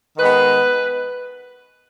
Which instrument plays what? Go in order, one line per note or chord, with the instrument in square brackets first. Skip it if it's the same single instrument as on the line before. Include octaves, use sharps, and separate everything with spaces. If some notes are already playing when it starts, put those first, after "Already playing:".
[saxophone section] D#3 G#3 B3 B4